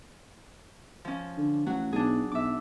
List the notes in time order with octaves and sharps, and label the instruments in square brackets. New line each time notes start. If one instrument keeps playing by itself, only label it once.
[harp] F3 C#4
[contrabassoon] D3
[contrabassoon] A1 [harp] F#3 F#4
[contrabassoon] B1 [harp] D4 G#4
[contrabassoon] B1 [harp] E5 D6